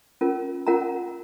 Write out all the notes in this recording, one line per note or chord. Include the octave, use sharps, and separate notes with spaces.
C#4 F4 A#4
C#4 F4 A#4 F#5 A#5